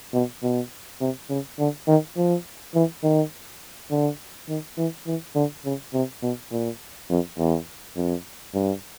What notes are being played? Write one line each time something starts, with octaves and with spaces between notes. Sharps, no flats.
B2
B2
C3
C#3
D3
D#3
F3
E3
D#3
D3
D#3
E3
E3
D3
C#3
C3
B2
A#2
F2
E2
F2
G2